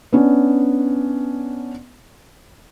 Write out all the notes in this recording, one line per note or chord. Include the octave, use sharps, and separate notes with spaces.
B3 C#4 D4